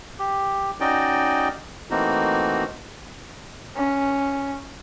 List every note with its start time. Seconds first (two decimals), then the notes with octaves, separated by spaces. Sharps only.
0.19 G4
0.80 C#4 D#4 F#4 D5 D#5 G5
1.91 E3 A3 A#3 C4 D#4 F#4
3.76 C#4